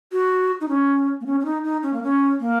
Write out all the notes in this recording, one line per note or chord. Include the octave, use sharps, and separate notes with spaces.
F#4
D#4
C#4
A#3
C#4
C#4
D#4
D#4
C#4
A#3
C#4
A#3